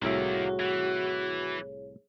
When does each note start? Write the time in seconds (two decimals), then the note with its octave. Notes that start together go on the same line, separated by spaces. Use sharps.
0.02 C2 A2 D#3 A#3 F#4 G#4 C#5 E5
0.60 E3